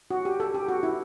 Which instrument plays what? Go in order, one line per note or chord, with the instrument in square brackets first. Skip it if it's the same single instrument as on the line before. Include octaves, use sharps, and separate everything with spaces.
[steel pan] F#4
G4
A4
G4
F#4
E4